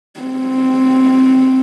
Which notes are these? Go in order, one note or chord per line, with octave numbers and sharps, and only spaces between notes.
C4